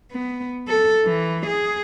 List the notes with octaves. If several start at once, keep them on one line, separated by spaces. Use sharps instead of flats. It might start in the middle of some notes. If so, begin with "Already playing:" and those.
B3
A4
E3
G#4